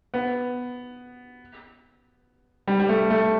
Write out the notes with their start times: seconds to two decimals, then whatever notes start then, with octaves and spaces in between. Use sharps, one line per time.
0.14 B3
2.68 G3
2.80 G3
2.89 A3
3.10 A3